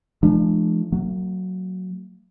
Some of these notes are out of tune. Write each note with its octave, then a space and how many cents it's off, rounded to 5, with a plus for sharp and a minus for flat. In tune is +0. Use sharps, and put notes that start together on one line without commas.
F3 -35 G#3 +40 D4 +35
F#3 +0 A#3 -45